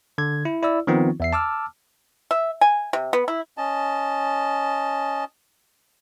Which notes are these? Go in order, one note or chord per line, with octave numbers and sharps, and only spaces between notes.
D3 G#6
E4
E4 D5 E6
D#3 F3 B3 C4 D#4 F4
E2 E5 C7
A5 D6 E6 F6
E5
G#5
C3
B3
E4
C#4 D#5 A5